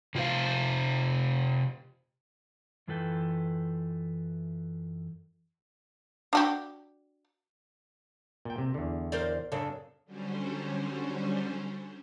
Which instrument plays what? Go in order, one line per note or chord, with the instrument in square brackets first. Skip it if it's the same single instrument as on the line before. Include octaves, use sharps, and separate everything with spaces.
[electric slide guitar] C3 F4 G#4 C5 F5
F#2 E3 F4 A4 B4 G5
[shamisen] D4 F#4 G4
[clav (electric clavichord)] A#2 G5
C3
E2 D3
[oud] A#4 C5 D5
[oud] F#2 C#3 [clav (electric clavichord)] D4 A4
[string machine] D3 F#3 G3 C#4 C5